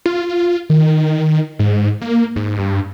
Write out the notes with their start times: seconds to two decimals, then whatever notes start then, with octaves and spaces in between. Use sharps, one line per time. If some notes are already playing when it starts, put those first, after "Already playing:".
0.06 F4
0.70 D#3
1.59 G#2
2.01 A#3
2.36 G#2
2.59 G2